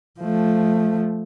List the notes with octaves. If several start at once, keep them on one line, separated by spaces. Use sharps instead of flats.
F3 A3